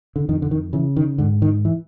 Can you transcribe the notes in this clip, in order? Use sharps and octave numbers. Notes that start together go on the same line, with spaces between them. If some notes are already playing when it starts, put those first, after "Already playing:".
D3
F2 D#3
D3
D#3
C#3 E3
D#3
G#2 D3
D#3
E3